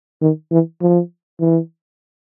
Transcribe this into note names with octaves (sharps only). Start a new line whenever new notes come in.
D#3
E3
F3
E3